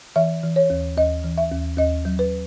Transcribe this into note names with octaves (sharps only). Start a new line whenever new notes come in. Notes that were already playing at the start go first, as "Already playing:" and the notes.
E3 E5
E3
C#5
D#2
D#2 D#5
E3
E5
D#2
D#2 D#5
F#3
B4